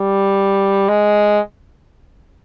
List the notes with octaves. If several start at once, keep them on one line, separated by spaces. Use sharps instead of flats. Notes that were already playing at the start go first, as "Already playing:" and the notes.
Already playing: G3
G#3